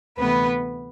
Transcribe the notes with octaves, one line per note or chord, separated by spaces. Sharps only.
D2 C3 E3 A3 B3 B4